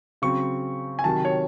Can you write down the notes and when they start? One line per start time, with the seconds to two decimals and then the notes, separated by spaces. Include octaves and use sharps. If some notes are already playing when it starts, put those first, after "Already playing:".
0.22 C#3 F#3 C4 C#6
0.99 G#5
1.04 C3 D#3 F#3 A5
1.25 C#5